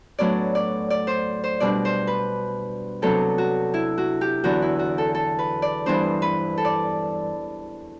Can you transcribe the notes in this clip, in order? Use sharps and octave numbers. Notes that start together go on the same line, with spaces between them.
A2 F#3 B3 D4 D5
D5
D5
C5
C5
B2 G3 D4 D5
C5
B4
C3 F#3 B3 D4 A4
F#4
E4
F#4
G4
E2 D3 F#3 B3 F#4
E4
F#4
A4
A4
B4
D5
G2 E3 B3 D4 C5
B4
A4
D5